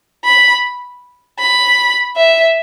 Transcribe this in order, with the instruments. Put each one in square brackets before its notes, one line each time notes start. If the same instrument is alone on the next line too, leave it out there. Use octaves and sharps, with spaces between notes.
[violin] B5
B5
E5